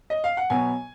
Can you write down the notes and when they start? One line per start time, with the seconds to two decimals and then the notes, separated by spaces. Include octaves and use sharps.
0.10 D#5
0.24 F5
0.37 F#5
0.50 B2 F#3 B3 G#5